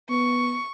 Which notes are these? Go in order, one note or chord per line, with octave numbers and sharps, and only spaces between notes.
B3 C#6